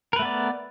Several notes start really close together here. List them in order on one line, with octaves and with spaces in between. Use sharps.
A#4 B4 A3 B3 D5